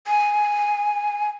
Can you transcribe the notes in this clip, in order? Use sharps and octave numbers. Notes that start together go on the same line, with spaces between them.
G#5